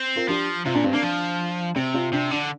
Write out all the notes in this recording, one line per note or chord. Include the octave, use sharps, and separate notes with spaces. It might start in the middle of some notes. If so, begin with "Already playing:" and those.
Already playing: C4
F4 A#4
F3 D4 G4
C3 C4 F4
A#2 D4
G2 C4
A#3 D4
F3
C3 C4
C4 F4
C3 D4
D3 D4